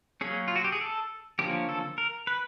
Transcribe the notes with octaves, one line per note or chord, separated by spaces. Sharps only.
F#3 A#3 C#4 G#4
F4
F#4
G4
G#4
A4
D3 F3 A#3 C#4 G4
A4
A#4
B4